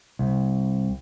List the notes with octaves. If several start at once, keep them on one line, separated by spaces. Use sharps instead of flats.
C2